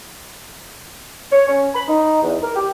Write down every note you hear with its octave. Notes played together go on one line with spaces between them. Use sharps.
C#5
C#4
B5
D#4
E2
A#4
G4